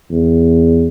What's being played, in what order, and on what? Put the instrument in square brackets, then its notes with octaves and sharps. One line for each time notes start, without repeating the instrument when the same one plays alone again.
[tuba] E2